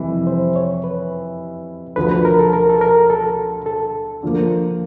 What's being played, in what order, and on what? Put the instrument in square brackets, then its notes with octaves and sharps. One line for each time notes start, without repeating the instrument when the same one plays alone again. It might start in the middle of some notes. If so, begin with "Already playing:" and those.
Already playing: [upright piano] F2 C3 E3 G3
[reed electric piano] C5
C#5
B4
[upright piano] D2 D3 F3 [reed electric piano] B4
[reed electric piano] B4
A#4
A4
A#4
A4
A#4
A4
A4
[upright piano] D3 F3 A#3